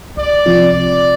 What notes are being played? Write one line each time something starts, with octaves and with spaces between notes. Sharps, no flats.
C2 D5
C3 F3 C4 F4
C2 D5